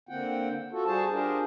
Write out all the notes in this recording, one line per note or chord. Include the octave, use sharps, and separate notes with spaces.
D3 A#3 C4 F#5 G5
F4 F#4 A4
G3 F#4 G#4 C5 A5
D4 F4 G4 G#4 A#4 C5